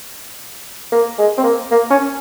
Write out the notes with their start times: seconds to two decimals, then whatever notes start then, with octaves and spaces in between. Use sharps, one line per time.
0.92 A#3
1.18 G#3
1.38 C4
1.44 A#3
1.71 A#3
1.90 C#4